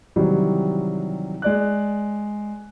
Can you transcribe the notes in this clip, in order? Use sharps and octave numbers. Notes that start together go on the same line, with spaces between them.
C3 D#3 E3 F#3 G3
G#3 D5 F#6